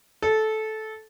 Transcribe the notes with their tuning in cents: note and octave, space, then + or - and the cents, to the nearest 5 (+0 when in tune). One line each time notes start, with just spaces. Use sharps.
A4 -15